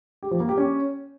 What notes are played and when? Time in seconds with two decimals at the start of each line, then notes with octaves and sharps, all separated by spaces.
0.23 G4
0.31 F3
0.40 A#3
0.49 G4
0.58 C#4